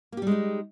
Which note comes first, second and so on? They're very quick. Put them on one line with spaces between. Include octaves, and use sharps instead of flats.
A#3 G4 G3 G#3 D#4